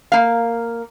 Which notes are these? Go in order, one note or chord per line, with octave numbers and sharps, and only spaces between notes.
A#3 F5